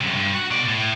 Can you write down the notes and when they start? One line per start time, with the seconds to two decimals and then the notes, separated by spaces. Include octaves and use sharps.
0.01 F#2 C3
0.17 G2
0.34 F#4
0.51 B2 D5
0.68 A2